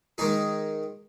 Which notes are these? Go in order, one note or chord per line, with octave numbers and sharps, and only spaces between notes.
D#3 G#3 D#4 G#4